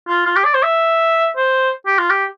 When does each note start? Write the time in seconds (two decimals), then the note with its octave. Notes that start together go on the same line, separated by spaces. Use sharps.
0.08 F4
0.26 F4
0.36 G4
0.45 D5
0.54 C5
0.63 E5
1.37 C5
1.86 G4
1.98 F4
2.10 G4